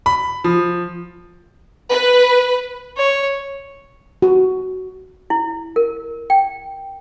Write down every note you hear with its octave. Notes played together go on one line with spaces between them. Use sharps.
B5
F3
B4
C#5
F#4
E4
A#4
G5